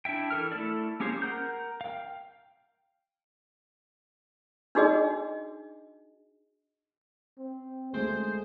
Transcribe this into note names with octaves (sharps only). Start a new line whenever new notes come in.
D4 E4 E5 G5
E3 A4 A#4 F6
A3 E4 A4 D5
A#3 C#4 G4 G#4 C5
A#4 F#5 A#5 G6
F5 G5
D4 D#4 F#4 G#4 D#5
C4
D2 G#3 A3 G#4 C5